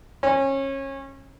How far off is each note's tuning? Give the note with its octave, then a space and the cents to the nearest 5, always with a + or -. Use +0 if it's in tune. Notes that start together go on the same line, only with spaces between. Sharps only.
C#4 -25